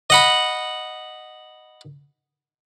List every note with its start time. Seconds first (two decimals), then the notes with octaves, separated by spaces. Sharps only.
0.10 D#5 F#5 B5